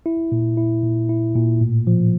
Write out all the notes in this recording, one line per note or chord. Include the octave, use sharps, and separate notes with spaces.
E4
A#2
E4
A#2
E4
A#2
A2
F3